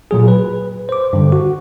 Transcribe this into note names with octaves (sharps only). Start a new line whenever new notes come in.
A#2 F#3 G#4
B4
C5 D6
G2 D3
F#4